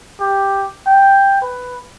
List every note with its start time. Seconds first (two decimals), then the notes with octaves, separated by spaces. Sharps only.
0.20 G4
0.86 G5
1.42 B4